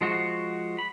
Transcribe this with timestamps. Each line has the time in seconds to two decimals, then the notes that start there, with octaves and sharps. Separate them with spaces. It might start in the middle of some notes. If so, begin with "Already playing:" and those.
0.01 F3 G#3 F#4 C5
0.79 B5